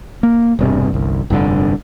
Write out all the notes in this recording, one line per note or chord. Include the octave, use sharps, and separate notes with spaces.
A#3
E1 G2 C3
G1 C2
F1 G2 A#2 D3